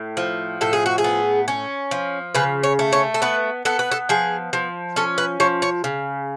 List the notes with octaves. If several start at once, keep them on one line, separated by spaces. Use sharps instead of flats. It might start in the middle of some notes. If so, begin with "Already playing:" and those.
Already playing: A2
F3
A2 A4
G#4
F#4
G#4
B3
C#4
F3
C#3 B4
C#5
A3
C#5
A4
B3 B4
B3 A4
B4
A4
F3 G#4
F3
C#4 A4
B4
F3 C#5
C#5
C#3